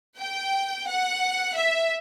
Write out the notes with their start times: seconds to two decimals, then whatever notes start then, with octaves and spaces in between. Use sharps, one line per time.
0.18 G5
0.88 F#5
1.56 E5